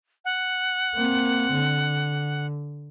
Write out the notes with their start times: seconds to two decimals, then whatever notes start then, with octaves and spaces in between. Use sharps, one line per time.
0.25 F#5
0.96 A#3 C4
1.53 D3